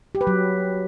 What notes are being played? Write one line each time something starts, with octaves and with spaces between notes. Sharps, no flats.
G4
B4
F#3